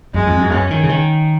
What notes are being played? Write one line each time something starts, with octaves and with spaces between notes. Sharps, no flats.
F#2 G#3
F2
F#2
F#2 C#4
D#3
C#3
D#3